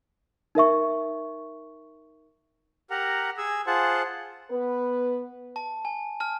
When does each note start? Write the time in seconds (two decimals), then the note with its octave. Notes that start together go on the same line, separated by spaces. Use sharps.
0.55 D#4 A#4 E5 C#6
2.91 G4 A#4 F#5 A#5
3.38 G#4 G#5 E6
3.67 F4 G#4 C5 F#5 A5
4.51 B3 B4
5.56 A5
5.85 G#5
6.20 A5 F6